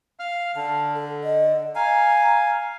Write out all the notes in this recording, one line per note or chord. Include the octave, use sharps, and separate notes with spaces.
F5 F6
D3 A5
A4
D#5
F5 G#5 A#5